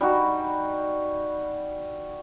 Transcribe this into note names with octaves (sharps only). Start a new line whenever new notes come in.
G3 D#4 F#4